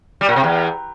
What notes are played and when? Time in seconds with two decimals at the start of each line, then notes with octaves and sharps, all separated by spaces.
0.21 G3
0.29 A#2
0.36 C3
0.44 E2